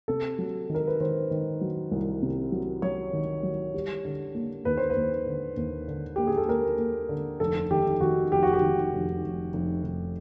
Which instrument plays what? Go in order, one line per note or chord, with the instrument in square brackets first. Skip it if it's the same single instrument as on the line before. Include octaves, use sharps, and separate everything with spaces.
[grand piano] C3 A4
F#3
D#3
A#4
B4
D#3 C5
D#3
F#3
C2
C3
F#3
F#3 C#5
D#3
F#3
G3
D3
A#3
D#2 B4
C5
B4
D#2
D3
D#2
D3
A#3 G4
G#4
A4
A#3 A#4
A#3
D3
F1 A4
D#3 G4
D#3 F#4
F1 G4
F#4
G4
D#3
F1
F1
F1
F1